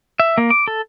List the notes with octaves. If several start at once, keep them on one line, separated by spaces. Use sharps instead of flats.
E5
A#3
D6
A4